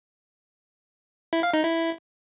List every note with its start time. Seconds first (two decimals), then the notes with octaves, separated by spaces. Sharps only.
1.33 E4
1.43 F5
1.54 D#4
1.64 E4